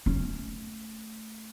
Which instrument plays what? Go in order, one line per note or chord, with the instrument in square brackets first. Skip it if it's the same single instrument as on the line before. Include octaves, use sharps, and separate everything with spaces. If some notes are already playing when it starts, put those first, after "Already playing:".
[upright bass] A3 C#4